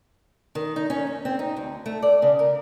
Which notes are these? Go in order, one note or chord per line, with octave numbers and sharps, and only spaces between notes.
D#3
D#4
C#4
F#2
C4
D#4
D2
A3
D5
C#3
A#4